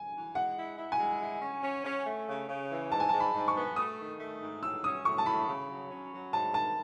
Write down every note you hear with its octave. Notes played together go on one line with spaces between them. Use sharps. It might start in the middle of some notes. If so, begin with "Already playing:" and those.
Already playing: G#5
E3
G#3 F#5
E4
E4
G#5
G#3
E4
C#4
C#4
C#4
A3
C#3
C#3
E3
G#2 A5
G#5
G#2 A5
B5
G#2
C#6
B3
A3 D#6
D#3
A3
G#2
A2 E6
C#4 D#6
A2 C#6
A5
A2 B5
C#3
F#3
C#4
F#3
G#2 A5
D#3 A5